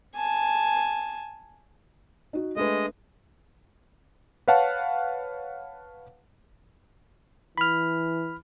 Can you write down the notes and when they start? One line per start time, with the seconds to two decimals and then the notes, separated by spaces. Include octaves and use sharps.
0.15 G#5 A5
2.33 D#4 F#4
2.56 G#3 A3 D4 B4 D#5
4.48 B4 C#5 F5 F#5 A5
7.58 E3 B5 F6